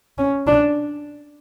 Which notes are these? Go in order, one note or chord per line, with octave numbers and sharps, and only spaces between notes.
C#4
D4